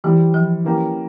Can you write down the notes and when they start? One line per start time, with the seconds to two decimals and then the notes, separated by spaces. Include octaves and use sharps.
0.04 E3 G3 C4 E4 G4
0.34 F3
0.64 E3 A#3 C#4 G4